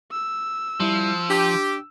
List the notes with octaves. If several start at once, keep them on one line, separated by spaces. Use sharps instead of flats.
E6
F3 G3 E4
D4 G4